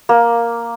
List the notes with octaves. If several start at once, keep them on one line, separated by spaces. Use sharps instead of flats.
A#3